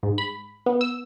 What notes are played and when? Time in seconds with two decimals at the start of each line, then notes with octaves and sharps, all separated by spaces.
0.03 G#2
0.18 B5
0.66 B3
0.81 E6